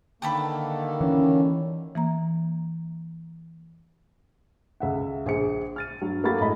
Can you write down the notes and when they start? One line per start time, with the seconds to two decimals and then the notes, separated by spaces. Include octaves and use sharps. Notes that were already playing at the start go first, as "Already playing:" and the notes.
0.22 D3 D#3 A#3 G4 A4 B4
1.01 E3 C#4
1.95 E3 A#3 A#5
4.80 C#2 E5 F#5
5.26 A#1 G#4 C5 C#7
5.76 F6 A6 D#7
6.01 G2 F#3
6.24 A#3 F#4 G4 A4 B5 A6
6.40 A2 G#3 D#5 B5